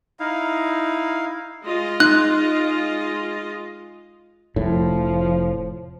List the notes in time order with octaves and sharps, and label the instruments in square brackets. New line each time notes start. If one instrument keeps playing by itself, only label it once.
[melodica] D#4 E4 F5
[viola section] G#3 F4 D#5
[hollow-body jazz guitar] D#4 [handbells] F#6
[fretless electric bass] F1 A2 [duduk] F3